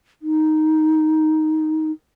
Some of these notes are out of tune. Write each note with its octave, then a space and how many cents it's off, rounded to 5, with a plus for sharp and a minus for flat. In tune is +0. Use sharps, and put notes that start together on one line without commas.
D#4 +5